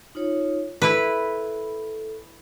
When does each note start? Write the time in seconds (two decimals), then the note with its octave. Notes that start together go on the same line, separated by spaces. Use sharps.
0.15 D#4 F4 C#5
0.82 E4 A4 B4